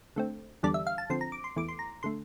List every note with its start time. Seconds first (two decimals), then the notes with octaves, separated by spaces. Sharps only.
0.16 D3 A3 C4
0.63 E2 D3 G3 D4 D5
0.74 E5
0.87 F5
0.98 A5
1.10 D3 F3 C4 C6
1.21 A#5
1.32 D6
1.44 C6
1.56 E2 E3 A3 D6
1.69 C6
1.79 A#5
2.03 D3 A3 C6